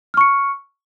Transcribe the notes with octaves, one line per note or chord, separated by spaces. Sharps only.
C#6 F6 C#7